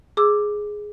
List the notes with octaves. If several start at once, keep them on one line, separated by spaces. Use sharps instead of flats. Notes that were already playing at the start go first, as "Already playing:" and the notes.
G#4 D6 E6